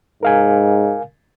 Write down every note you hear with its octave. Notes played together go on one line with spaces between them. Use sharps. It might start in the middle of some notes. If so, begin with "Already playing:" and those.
G#2 A#4 F5 G#5